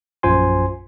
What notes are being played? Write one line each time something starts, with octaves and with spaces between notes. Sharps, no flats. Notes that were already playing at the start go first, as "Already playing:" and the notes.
A#1 F#2 F4 C5 G#5 C6